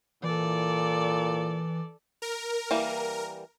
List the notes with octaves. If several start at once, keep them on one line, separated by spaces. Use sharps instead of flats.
A#2 E3 A4 D5
A#4
E3 G3 A#3